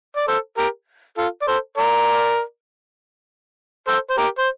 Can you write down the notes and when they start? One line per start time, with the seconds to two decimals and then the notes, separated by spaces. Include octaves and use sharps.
0.17 D5
0.28 A4 C5
0.58 G4 A#4
1.18 F4 A4
1.42 D5
1.48 A4 C5
1.78 A#4 D5
3.88 A4 C5
4.10 C5
4.18 G4 A#4
4.39 C5